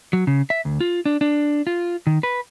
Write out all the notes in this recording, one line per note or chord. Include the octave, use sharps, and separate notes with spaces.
F#3
C#3
E5
D2
F4
D4
D4
F4
D#3
B4